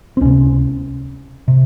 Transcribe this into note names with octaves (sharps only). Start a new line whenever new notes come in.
C4
C#2 C3 C#4
C3